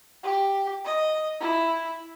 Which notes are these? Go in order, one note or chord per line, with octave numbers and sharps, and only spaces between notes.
G4
D#5
E4